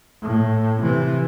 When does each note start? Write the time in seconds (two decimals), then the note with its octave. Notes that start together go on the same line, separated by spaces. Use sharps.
0.22 A2
0.82 C3 E3